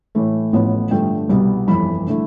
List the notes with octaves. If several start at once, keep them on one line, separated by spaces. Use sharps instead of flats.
A2 E3 A3
A1 A2 F3 B3
G2 D3 F3 A3 G5
C2 B2 G3 B3
G1 F2 E3 B5
D3 A3 E4